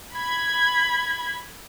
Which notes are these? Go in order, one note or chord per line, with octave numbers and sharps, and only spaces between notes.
B5 G#6